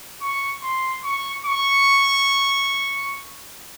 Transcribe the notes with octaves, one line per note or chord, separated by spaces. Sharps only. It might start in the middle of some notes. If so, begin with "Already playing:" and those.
C#6
C6
C#6
C#6